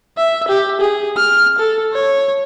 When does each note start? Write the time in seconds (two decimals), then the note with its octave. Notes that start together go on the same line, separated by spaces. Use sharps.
0.18 E5
0.48 G4
0.81 G#4
1.17 F6
1.58 A4
1.94 C#5